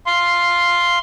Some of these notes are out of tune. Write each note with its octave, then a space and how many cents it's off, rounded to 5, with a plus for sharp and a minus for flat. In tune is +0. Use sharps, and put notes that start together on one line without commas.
F5 -5 C6 +0